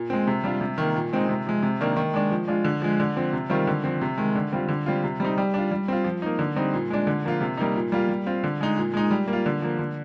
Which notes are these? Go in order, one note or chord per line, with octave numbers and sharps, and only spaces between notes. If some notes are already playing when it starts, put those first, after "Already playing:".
Already playing: A#2
G#3 C4
C3
G3 D4 F4
C3
D#3 A#3
A#2
G#3 C4 D#4
C3
F3 G#3
C3
D#3 A#3 D4
D#3
G#3 D4
F3
G#3 D4 F4
D3
F3 G#3
D3
F3 C4
C3
D#3 G3 C4 F4
D3
F3 C4
C3
D#3 G#3
D3
G3 C4 F4
D3
G3 C4 F4
C3
G3 C4 D#4
G3
D4 F4
G3
C4 F4
F3
A#3 D#4
D3
G3 C4 D#4
A#2
G#3 D4
D3
F3 A#3 F4
C3
G3 A#3 D#4
A#2
G3 A#3 F4
G3
C4 F4
D3
G#3 D#4
A#2
G#3 D#4
G3
A#3
F4
D3
F3 A#3
D3